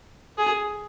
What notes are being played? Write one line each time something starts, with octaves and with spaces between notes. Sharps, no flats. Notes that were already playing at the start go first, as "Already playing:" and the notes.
G#4